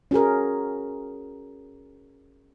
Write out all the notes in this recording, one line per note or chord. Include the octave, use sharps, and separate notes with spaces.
C#4 F#4 G#4 A#4